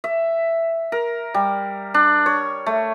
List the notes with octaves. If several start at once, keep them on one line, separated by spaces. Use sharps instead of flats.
E5
A#4
G3
D4
C#5
A3